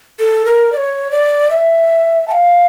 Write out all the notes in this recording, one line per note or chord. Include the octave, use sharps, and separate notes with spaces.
A4
A#4
D5
C#5
D5
E5
A5
F5